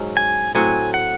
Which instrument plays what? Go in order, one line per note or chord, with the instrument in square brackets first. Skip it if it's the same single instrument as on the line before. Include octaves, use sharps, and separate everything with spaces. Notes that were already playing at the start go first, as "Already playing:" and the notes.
Already playing: [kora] G#2 F#3 C#4
[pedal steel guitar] G#5
[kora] A2 F#3 C4 F#4 [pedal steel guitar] G#5
[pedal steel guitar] F#5